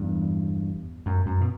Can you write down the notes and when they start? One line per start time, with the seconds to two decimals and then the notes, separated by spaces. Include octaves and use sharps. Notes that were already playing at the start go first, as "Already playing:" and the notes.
Already playing: E2 G2
1.06 F#2
1.26 F#2
1.41 B2